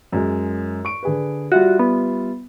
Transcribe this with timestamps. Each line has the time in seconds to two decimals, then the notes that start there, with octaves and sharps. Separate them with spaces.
0.13 F#2 G#3
0.85 C#6 D7
1.03 D3 G#4 B4
1.52 G3 F4 F#4 E5
1.79 B3